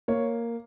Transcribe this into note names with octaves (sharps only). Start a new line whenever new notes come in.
A#3 C#5